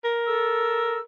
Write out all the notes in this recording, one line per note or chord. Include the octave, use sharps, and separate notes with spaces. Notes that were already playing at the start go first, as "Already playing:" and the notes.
A#4
A4 E6